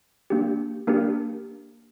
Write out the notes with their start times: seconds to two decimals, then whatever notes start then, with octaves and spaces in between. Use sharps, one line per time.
0.30 A#3 D4 G4
0.87 A#3 D4 G4 A#4